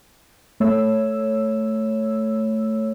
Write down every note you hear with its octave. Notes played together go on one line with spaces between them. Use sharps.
A3 C#5 E6